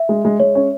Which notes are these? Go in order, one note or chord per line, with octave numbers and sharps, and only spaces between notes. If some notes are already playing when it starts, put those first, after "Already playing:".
Already playing: E5
G#3
G#3
G#3 C#5
C#4